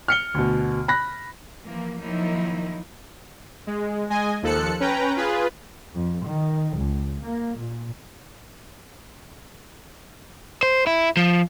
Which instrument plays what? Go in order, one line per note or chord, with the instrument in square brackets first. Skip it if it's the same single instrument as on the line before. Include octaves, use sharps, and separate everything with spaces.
[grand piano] F6 C#7 G7
D2 B2
B5 F#6 A#6
[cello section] E3 F3 A#3
D#3 F3 F#3 A#3 D#4 E4
[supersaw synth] G#3
G#3 D#5 G#5
D#2 F3 A4 F#6 C#7
C#4 B4 G5 A#5
F4 G#4 B4
[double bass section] F2
D#3
C#2
A#3
A#2
[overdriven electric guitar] C5
E4
F3